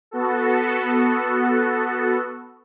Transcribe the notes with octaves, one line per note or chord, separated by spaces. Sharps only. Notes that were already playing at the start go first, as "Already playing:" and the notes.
B3 F#4 A4